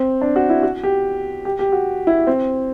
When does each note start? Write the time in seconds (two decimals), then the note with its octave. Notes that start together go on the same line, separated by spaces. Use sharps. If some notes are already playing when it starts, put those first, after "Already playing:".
Already playing: C4
0.21 D4
0.36 F#4
0.50 E4
0.63 F#4
0.83 G4
1.45 G4
1.59 G4
1.72 F#4
2.07 E4
2.27 C4